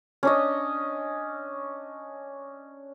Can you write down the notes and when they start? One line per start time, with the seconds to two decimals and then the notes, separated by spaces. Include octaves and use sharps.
0.23 C#4 D4 D#5